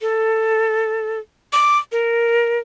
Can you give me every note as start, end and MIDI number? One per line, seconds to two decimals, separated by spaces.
0.01 1.19 69
1.53 1.78 86
1.92 2.59 70